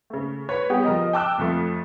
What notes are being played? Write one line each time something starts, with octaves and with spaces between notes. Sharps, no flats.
C#3 A3
B4 C#5
G3 B3 G4 G#4
F3 A#4 D#5
G5 A5 D6 E6 F#6
F2 F3 A3